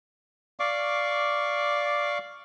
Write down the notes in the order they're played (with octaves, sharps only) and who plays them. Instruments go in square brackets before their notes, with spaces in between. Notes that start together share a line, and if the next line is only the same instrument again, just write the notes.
[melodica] D5 F5 C#6 D6